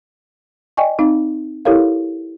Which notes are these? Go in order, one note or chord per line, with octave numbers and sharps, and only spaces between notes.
D5 D#5 G5 G#5 C#6
C4 D#4 F5
E4 G4 A4 A#4 C#5 F5